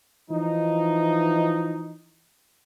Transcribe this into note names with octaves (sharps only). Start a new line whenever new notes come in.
E3 F3 D#4